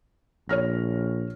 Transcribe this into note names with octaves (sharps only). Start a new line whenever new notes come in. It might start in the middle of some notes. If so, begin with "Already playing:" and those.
A#1 C#5 F6 A#6